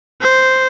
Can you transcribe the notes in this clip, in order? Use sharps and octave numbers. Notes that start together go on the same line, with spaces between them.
C5